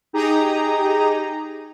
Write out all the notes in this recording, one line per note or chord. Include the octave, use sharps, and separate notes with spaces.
D#4 G4 G#4 A#5 D#6